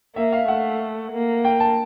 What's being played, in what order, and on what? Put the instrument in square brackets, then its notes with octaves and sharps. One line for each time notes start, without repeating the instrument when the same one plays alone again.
[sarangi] A#3 [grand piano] E5
[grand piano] F5
[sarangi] A3 [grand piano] F#5
[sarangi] A#3
[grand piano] G5
A5